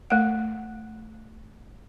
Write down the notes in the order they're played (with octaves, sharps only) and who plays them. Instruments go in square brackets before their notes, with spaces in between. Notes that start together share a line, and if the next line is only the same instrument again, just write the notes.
[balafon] A3 F#5